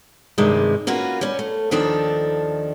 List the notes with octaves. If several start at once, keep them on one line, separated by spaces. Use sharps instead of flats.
G2 C3 D#3 G#3
A#3 C#4 F4 F#4 B4
G3 C#4
A3
D#2 D#3 F3 D4 A4 G5